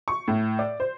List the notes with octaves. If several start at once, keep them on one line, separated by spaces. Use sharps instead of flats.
C#6
A2
D5
C5